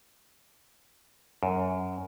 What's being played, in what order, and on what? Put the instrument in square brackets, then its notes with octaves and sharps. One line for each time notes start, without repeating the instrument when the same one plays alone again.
[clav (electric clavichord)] F#2